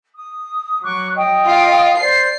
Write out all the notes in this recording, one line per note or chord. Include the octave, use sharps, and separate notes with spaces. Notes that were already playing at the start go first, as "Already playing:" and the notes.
D#6
F#3 C#6 D6 F#6
D#5 G5 D#6
F4
C5 D5 C7